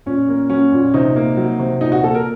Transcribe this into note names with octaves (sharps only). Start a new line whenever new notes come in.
A#2 C#4
A#3
F#3 C#4
A#2
C3 D#4
A#3
F#3
C3
A#2 D#4
F#4
A#3 A4
A#4